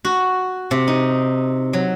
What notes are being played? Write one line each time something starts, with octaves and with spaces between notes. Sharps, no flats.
F#4
C3
D#4
F#3